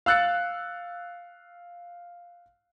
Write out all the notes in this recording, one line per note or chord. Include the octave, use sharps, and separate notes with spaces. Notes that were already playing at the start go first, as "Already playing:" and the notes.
F5 E6 F#6 A6 C#7